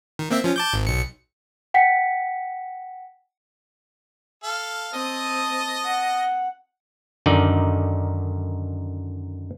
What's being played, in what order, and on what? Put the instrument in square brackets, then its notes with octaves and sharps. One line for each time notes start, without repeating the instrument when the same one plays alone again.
[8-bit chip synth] D#3
A#3 C4 E5
F3 C#4
A5 D6 G6
G#1
B1 C#7
[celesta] F#5 G5 B6 C#7
[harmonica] A4 F5
[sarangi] C4 [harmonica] D#5 [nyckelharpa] A5 D#6
[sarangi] F#5
[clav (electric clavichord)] F#2 D3 D#3 D#4 D5